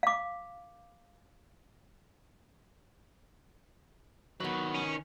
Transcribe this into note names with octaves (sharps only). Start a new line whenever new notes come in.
F5 D6
D#3 F#3 B3 B4
C#4